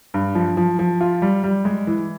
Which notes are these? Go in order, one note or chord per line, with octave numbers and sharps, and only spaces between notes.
G2
F3
F3
F3
F4
G3
G3
G#3
E3